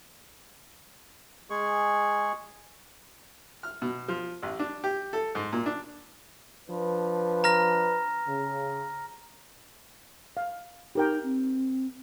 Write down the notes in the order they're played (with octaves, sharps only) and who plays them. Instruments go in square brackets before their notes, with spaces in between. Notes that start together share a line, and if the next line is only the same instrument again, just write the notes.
[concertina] G#3 G#4 C#6
[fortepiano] F6
B2
F3
A1
D4
G4
A4
G#2
A#2
D4
[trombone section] F3 D4 B4
[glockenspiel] A#5 F6 A#6
[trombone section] C#3
[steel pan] F5
[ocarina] D#4 [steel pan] G4 A#4 G5
[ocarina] C4